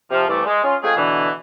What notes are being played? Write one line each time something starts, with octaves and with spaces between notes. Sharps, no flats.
C3 F3
C2 E3 A3 D5
G#3
C#4 F4
G#3 A3 C4 F4 G#4
B2 D3 E3